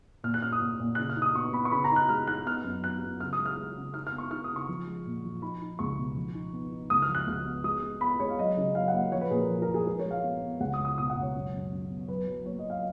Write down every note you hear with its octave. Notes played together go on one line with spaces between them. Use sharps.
A#2 F6
F#6
C#4 F6
D#6
A#2
A#2
C#3 F#6
F6
D#4
D#6
B3 C#6
B3 B5
C#6
C#3 B5
A#5
D#4
F#6
G#3 F6
D#4 F#6
B3 F6
F#2
B3 F#6
F#2
C#3 F6
D#6
G#3
F6
G#3
C#3
D#4 F6
F6
B3
C#6
D#4 F6
D#6
C#3
C#6
F3
G#3
A#2
F3
D#4 B5
D#4
C#2 C#6
B2
F3
D#4
B3
D#4
C#2 D#6
F6
F3
F#6
C#2 F6
B3
G#3 D#6
G#3
B3 B5
G#3 C#5
F5
F#3 D#5
C#3
F#3 F5
F#5
A#3
F3 C#5
B4
A#2 G#4
A#4
F3
A#4
F3
G#4
G#3 A#4
C#5
G#3 F5
B3
B3
C#2 F#5
D#6
C#2
D#6
B2 D#6
F#5
C#2
C#5
F#2
F#2
F#2
B3
F#3 B4
F#3
A#3 C#5
D#5
F#3
F5